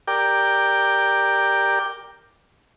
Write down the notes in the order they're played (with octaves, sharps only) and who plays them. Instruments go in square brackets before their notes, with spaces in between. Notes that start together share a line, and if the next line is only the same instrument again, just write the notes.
[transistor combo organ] G4 A#4 D5 G5